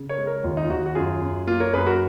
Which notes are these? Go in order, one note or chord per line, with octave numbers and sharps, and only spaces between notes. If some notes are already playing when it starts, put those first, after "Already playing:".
Already playing: C#3
A#4 C#5
G#3
A#4 C#5
D#2 F4
D#4
F4
D#2 D#4 F#4
F#4
F#2 F4 G#4
F#2
A#3 F4
A#4 C#5
F#2 G#4 B4
F#4 A#4